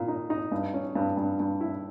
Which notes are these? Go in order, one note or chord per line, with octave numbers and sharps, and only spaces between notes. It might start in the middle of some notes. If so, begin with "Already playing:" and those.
Already playing: A#2
D#4
D#4
G2
C#4
G2
G2
G2
E4